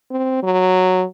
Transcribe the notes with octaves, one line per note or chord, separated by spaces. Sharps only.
C4
F#3